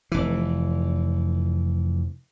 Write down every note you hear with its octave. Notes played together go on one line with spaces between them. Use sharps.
F1 E3